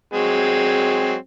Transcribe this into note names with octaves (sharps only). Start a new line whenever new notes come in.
F#3 G#3 C4